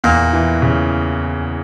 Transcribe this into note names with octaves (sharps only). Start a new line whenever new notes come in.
E2 A#2
E3
C#3